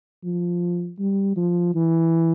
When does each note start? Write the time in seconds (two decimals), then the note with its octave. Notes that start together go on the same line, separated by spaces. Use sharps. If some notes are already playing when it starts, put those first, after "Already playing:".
0.24 F3
0.99 G3
1.37 F3
1.75 E3